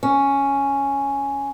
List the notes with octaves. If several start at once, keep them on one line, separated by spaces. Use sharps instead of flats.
C#4